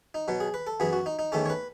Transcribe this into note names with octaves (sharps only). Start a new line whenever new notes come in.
D#4
B2 F#3 B3
G#4
B4
A4
F#2 E3 B3 G#4
F#4
D#4
D#4
E2 D#3 A3 C#4 A4
C#5
B4